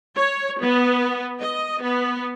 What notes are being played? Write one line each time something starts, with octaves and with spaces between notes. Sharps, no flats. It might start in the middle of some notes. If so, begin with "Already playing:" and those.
C#5
B3
D#5
B3